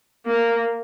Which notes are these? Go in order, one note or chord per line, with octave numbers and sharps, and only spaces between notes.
A#3